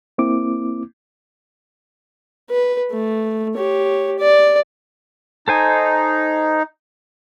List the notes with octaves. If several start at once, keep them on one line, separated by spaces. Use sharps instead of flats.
A#3 C4 E4 D6
B4
A3
G4 C#5
D5
D#4 A4 C5 G#5